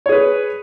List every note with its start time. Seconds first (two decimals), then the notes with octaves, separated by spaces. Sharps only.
0.06 C#5
0.09 G#4
0.12 B4